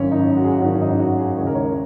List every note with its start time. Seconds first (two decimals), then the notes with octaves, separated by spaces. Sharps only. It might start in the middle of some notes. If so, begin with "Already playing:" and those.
Already playing: G#1 F#2 D#3 C#4
0.11 D#4
0.37 F#4
0.44 G#4
0.51 F#4
0.62 G#1 F#2 D#3 C#4
0.81 D#4
0.99 F#4
1.18 G#4
1.37 D#2 C#3 G#3 C#5
1.47 A#4
1.55 C#5